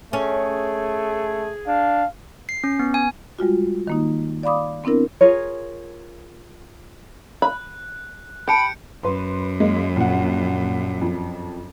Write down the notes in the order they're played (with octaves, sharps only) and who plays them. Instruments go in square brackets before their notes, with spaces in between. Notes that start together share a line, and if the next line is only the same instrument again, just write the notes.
[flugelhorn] A3 [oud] C#4 [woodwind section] G#4
[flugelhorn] D4 [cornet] F5
[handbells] C7
C#4
B3
G#5
[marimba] G3 G#3 F4 F#4
D#3 A#3 D#4
D5 F5 B5 D6 D#6
B3 C4 D4 E4 A#4
[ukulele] F4 G#4 A#4 C#5
[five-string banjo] B5 [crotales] F#6
[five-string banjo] G4 [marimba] G5 A5 [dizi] B5 [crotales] G6 C#7 D7
[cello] F#2 [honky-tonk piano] B4 C6
[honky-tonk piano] G#3 A#3
A#1 F#5
F2